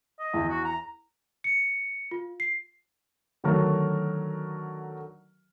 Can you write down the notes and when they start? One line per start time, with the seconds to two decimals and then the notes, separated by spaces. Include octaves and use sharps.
0.20 D#5
0.34 E2
0.49 F#4
0.65 A#5
1.44 C#7
2.11 F4
2.40 C7
3.44 D3 D#3 F#3 A3 F#4 A#4